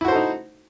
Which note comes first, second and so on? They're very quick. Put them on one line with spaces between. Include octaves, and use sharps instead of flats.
E4 F#4 C5 A4 D#4